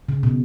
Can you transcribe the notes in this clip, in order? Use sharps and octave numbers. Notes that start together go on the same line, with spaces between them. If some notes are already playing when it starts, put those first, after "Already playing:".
C#3
B2